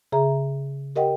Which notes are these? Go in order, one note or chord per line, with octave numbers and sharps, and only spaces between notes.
C#3 G#4 E5 A#5
G4 A#4 D#5 F#5 G5